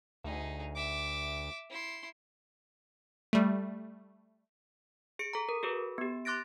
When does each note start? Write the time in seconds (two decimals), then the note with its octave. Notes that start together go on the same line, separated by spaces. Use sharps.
0.24 D2 D#4 G#4
0.75 E5 D6
1.70 E4 C6
3.33 G3 A3
5.19 G#4 C#7 D7
5.33 A4 A#5
5.49 A#4
5.63 F#4 G#4 A4 B4
5.98 B3 G4
6.25 C6 D6 F#6 A6 A#6 D7